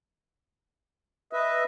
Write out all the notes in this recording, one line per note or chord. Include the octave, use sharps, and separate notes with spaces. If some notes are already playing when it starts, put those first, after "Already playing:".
B4 D#5 E5